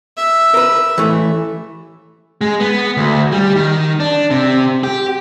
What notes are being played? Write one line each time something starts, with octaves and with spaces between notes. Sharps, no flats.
E5
A#4 B4
E3 A3
G#3
B3
D2
G3
D#3
D4
C3
G4